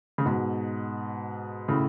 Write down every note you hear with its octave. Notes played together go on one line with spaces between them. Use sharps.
C#3
G#2 B2
A2 C#3